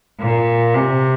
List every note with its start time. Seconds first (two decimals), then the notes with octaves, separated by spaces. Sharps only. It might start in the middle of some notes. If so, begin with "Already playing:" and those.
0.20 A#2
0.74 C3